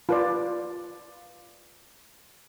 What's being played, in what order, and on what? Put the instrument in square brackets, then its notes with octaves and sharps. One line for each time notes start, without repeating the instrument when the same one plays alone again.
[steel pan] F4 B4 D5